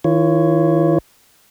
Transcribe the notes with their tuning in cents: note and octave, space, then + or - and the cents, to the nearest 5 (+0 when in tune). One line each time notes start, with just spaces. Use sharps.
D#3 +35 F4 -35 C#5 +0